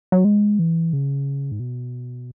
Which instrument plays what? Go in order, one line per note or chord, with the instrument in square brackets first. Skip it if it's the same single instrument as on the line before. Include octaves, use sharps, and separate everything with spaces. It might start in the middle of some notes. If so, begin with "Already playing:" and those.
[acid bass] F#3
G#3
E3
C#3
G#2
B2